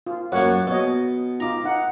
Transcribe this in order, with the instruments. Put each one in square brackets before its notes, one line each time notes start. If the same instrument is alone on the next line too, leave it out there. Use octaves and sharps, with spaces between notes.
[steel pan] F4
[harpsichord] F#2 A#3 [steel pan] C#5 F#5
[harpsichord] B2 [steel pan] C#5 D#5
[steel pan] D#4 F4 [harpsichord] A#5 D6
[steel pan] D#4 F#5